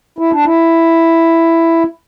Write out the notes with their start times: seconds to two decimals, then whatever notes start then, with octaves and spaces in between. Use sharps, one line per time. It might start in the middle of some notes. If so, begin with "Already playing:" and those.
0.19 E4
0.32 D4
0.45 E4